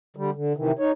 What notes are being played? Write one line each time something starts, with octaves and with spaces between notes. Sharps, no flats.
D3 G3
D3
C3 D#3 E3
D#4 C#5